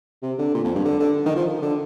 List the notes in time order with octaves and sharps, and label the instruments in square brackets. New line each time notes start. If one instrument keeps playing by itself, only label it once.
[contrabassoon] C3
D3
A#2
F2
G2
D3
D3
D#3
F3
D3